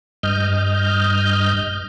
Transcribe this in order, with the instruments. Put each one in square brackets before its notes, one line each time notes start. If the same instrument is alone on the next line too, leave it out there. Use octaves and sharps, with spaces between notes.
[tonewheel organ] G2 D#5 F6 G6